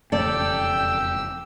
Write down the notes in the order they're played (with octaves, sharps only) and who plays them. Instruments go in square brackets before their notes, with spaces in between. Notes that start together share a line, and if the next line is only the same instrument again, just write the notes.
[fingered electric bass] E1 F2 C#3 [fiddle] G4 E6 [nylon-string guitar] A4 D5 [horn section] G5